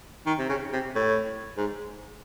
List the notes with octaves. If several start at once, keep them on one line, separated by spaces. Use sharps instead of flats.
D#3
C3
C#3
C3
A2
G#2